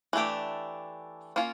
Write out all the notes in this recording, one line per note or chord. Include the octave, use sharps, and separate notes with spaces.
E3 A3 D4 G4
A#3 C#4 F4